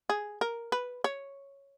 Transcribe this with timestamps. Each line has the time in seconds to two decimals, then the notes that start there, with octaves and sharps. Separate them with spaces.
0.09 G#4
0.41 A#4
0.72 B4
1.04 C#5